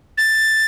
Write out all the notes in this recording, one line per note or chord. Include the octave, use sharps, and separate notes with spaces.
A6